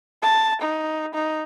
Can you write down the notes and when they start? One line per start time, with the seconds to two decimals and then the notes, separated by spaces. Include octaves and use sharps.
0.22 A5
0.62 D#4
1.14 D#4